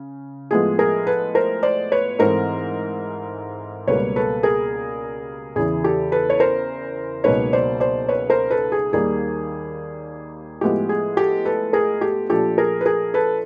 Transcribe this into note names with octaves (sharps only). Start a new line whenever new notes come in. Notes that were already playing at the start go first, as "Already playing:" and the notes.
Already playing: C#3
A2 F3 G#3 B3 G#4
G#4 A#4
A4 B4
A#4 C5
C5 D5
B4 C#5
G#2 E3 A3 C4 A#4 C5
C#2 B2 G3 A#3 B4 C#5
A4 B4
G#4 A#4
E2 C#3 E3 G#4
G4 A4
A4 B4
C#5
A#4 C5
C#2 B2 F#3 A#3 D#4 B4 C#5
C5 D5
C5 D5
B4 C#5
A#4 C5
A4 B4
G#4
D#2 D#3 G3 A#3 G#4
A2 F3 G#3 B3 E4 G4
G#4
G4 A4
A4 B4
G#4 A#4
G4 A4
A#2 F3 A3 D4 G4 A4
G#4 A#4
B4
G#4 A#4
A4 B4